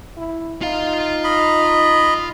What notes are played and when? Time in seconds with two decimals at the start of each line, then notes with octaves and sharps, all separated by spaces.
0.17 E4
0.62 D#4 F4 F5
1.24 D#5 B5